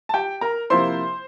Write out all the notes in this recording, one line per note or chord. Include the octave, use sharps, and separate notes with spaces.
A5
G4 G5
A#4 A#5
C3 F3 A#3 E4 C5 C6